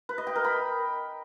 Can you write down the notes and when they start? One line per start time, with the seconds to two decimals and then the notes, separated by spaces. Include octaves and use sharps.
0.09 B4
0.18 D#5
0.27 G5
0.36 A#4
0.44 B5